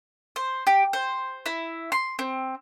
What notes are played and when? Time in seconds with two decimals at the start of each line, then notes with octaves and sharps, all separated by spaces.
0.36 C5
0.67 G4
0.93 C5
1.46 E4
1.92 C6
2.19 C4